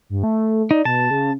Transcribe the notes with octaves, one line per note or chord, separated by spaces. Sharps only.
G2
A3
D#4 D5
B2 A5
C#3